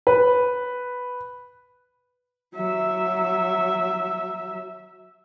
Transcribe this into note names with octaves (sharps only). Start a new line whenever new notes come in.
B4
F#3 E5